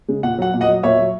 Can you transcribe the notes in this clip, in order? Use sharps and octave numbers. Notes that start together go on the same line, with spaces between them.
C#3 G#3
A#2 F#5
F#3 F#5
A#2
D#5 F#5
F#3
A#2 C#5 E5
F#3